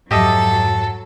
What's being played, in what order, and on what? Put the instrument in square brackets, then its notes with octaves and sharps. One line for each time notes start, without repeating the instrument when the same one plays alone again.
[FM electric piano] F2 G#2 [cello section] F#3 [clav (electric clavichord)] G4 D#5 E5 [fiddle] A4